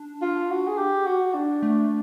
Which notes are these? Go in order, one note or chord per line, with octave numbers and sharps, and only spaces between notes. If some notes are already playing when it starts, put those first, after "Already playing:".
Already playing: D4
F4
F#4
G#4
G4
F#4
D4
A3